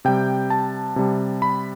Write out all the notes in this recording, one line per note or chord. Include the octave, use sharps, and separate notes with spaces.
C3 G3 G5
A5
C3 G3
B5